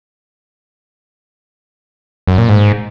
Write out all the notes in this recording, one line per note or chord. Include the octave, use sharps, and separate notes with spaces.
F#2
A#2
G#2